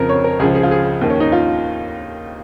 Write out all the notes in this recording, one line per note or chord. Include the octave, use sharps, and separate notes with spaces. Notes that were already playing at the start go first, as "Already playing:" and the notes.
Already playing: F2 C#3 F3 A#4
C#5
A#4
C#2 C#3 F3 G#4
G#4
F4
G#4
D#2 D#3
C#4
D#4
F4